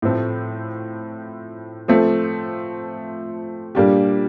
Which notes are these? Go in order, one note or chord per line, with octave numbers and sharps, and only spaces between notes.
A2 F3 A3 C4
F3 A3 C4
A#2 G3 A#3 D4 G4